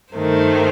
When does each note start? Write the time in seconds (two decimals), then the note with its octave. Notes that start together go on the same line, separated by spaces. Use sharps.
0.14 G2 D#3 A3 C5